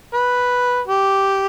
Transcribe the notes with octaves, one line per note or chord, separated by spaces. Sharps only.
B4
G4